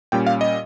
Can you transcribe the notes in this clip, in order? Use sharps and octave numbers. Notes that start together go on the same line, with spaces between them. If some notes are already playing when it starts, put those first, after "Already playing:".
A#2 G3 C#4 G5
F5
D#5